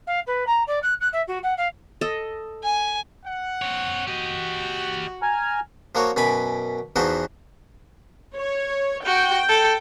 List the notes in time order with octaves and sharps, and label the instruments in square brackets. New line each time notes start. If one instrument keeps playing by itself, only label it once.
[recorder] F5
B4
A#5
D5
F#6
F#6
E5
F#4
F#5
F5
[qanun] A4 D#5
[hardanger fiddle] G#5
[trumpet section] F#5
[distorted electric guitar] C4 C#5
[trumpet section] F#4 [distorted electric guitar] G4 D#5
[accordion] G#5 A#5 F6
[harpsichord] F3 A#3 F#4 C#5
F#2 B2 G#5 B5 D6
E2 E3 F3 D#4 F#4 C5
[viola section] C#5
[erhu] F#4 [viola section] G5
[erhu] A4